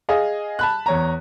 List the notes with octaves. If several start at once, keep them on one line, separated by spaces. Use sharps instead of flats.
G#4 D#5 F5
A5 B5 F#6
E2 C#5 A#5